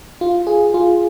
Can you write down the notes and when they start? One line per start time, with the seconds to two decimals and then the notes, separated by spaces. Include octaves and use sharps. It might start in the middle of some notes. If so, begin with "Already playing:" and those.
0.21 F4
0.47 G#4
0.74 F4